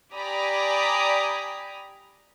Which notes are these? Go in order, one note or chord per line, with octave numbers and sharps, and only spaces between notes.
G4 D5 G#5 A#5 B5 D#6